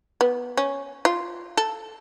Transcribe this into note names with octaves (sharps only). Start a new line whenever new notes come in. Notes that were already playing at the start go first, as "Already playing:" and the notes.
B3
C#4
F4
A4